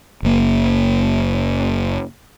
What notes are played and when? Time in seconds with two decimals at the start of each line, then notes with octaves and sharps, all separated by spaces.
0.23 F#1 A#3